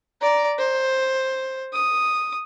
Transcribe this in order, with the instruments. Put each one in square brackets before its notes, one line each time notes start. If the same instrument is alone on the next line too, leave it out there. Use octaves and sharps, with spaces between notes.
[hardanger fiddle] D5 A#5
C5
D#6